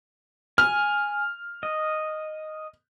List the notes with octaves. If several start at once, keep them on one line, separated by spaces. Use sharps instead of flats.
G#5 F6
D#5